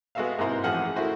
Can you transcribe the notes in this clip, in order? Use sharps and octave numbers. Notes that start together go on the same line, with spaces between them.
G#3 B3 F#4 A4 E5 F5
G#2 C3 A#3 E4 C5 A#5
A1 A2 F3 G#4 F#5 F6
D#3 A3 E4 F#4 C5